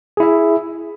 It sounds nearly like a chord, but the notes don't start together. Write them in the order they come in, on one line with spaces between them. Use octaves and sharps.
G#4 E4 E5